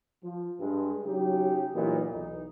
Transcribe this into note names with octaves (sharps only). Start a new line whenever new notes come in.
F3
G2 G#3
C#3 F#3 D#4 G4
A#2 E3 F#3 B3 D#4
B1 E2 D#4